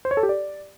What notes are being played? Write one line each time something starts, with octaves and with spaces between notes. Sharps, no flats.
C5
C#5
A4
G4
D5